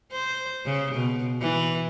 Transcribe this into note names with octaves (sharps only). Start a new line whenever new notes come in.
C5
C#3
B2
E3